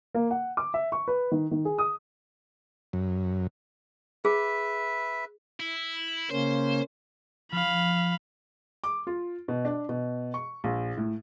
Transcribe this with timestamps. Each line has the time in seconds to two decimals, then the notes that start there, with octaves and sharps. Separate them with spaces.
0.15 A#3
0.31 F#5
0.57 D6
0.74 E5
0.92 C#6
1.08 B4
1.32 D#3
1.51 D#3
1.65 G#4
1.78 D#6
2.93 F#2
4.25 G#4 B4 E5
5.60 E4
6.31 C#3 A#3 C#4 C5
7.52 F3 F5 B5
8.84 D6
9.07 F4
9.48 B2
9.65 D4
9.89 B2
10.34 C#6
10.64 A#1
10.97 A2